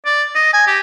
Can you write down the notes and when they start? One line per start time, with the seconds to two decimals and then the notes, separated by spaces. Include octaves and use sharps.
0.06 D5
0.35 D#5
0.54 G#5
0.67 G4